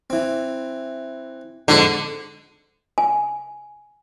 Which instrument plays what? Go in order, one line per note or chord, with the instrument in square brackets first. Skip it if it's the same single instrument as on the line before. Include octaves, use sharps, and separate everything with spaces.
[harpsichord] E3 C4
[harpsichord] F2 G#2 D6 [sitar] D3
[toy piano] G#5